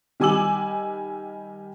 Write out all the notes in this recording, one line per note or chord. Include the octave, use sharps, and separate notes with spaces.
D#3 G3 G#5 D6 E6 F#7